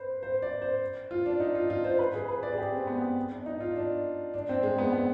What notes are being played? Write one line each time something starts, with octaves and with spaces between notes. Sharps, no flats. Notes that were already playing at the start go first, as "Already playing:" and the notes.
Already playing: B4 C5
C5
D5
C5
F4
D4
D#4
F4
F4
C5
B4
G#4
B4
D5
G#4
G4
C4
B3
B3
D4
D#4
F4
D4
D4
C4
G#3
B3
B3